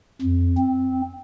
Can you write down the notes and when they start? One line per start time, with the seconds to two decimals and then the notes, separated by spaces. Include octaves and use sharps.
0.22 F2
0.58 C4